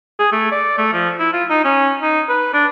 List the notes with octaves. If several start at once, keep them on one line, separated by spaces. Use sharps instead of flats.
G#4
A3
D5
A3
F3
E4
F4
D#4
C#4
D#4
B4
D4